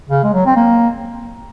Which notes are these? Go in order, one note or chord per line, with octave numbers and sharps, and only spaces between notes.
C#3
G#3
F#3
C4
A#3